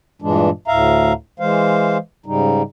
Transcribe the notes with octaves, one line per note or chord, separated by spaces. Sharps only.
G2 A#2 E3 G#3 D4
D2 A2 E5 F5 A#5
E3 G#3 C5 F5
G#2 C#3 G3 D#4